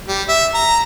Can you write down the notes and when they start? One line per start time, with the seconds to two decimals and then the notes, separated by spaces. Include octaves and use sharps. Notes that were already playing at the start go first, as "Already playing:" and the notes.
0.08 G3
0.28 E5
0.54 A#5